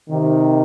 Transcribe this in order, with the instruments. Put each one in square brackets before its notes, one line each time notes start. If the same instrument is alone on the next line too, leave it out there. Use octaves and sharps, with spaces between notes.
[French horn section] C3 D#3